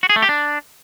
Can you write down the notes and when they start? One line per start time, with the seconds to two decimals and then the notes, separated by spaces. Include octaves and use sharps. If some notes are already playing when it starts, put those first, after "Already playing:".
0.03 F#4
0.09 G#4
0.16 A3
0.22 G4
0.29 D4